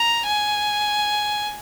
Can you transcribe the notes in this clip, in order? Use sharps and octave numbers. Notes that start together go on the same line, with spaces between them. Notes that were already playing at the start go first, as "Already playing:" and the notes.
Already playing: A#5
G#5